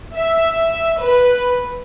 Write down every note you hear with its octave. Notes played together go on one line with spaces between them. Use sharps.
E5
B4